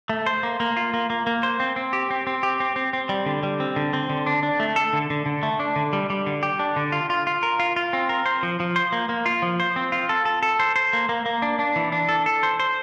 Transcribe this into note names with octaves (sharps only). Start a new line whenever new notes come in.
A3
C5
A#3
A#3
F4
A#3
A#3
A#3
C5
C4
C4
G4
C4
C4
G4
C4
C4
C4
G3
D3
G3
C4
D3
C4
D3
D4
D4
A3
A4
D3
D3
D3
A3
D4
D3
G3
G3
D3
G4
D4
D3
F4
F4
F4
A#4
F4
F4
C4
A#4
C5
F3
F3
C5
A#3
A#3
F4
F3
C5
C4
F4
A4
A4
A4
C5
C5
A#3
A#3
A#3
D4
D4
E3
D4
A4
A4
C5
C5